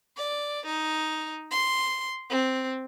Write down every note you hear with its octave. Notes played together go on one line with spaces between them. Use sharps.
D5
D#4
C6
C4